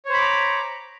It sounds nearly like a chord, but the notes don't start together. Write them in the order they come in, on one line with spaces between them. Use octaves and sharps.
C#5 C5 B5 D6 A#5